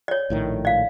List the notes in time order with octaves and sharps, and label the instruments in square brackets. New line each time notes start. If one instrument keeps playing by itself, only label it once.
[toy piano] C#5 D5
[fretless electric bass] A#1 A2 D#3
[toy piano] D5 F5